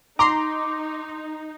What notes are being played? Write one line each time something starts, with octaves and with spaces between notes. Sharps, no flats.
D#4 A#5 C6 D6